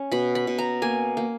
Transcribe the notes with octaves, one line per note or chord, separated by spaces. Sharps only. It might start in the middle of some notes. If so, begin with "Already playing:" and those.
Already playing: C#4
B2 B5
B5
B2
A#5
A#3 G#5
A#3